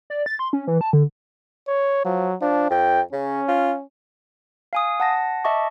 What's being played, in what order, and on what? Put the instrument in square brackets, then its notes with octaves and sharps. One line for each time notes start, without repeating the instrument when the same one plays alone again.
[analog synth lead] D5
A6
C6
C#4
E3
A5
D3
[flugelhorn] C#5
[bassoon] F3 [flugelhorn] F#3
[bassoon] F3 [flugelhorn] D4
[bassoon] F2 [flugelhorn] G5
[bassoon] C#3 [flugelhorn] C#4
[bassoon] F4
[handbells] F5 G#5 D#6
F#5 A5 A#6
D#5 E5 A5 C#6 D6